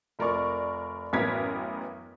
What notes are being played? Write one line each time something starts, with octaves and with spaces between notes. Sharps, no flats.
F1 A#4 D5 C#6
A1 F#2 B3 A#4 G#6 B6